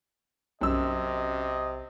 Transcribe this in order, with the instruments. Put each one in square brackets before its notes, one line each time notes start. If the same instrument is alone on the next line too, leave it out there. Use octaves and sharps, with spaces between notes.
[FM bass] B1 [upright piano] F#2 E6 [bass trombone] C3 [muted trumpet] D#5